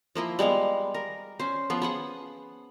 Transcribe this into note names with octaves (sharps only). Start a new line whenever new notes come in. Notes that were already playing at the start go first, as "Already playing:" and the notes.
F3 A#3 E4 C6
G3 G#3 B3 F5
A#4
C#4 C5
F3 B3 F4
B3 G#4 F#5